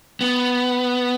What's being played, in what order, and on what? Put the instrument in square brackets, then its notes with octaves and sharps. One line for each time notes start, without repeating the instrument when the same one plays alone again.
[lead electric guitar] B3